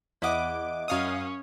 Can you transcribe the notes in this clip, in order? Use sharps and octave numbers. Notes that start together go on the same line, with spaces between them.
E2 E4 D#5 F#5 D6
F#2 C#4 C#5 F5 D#6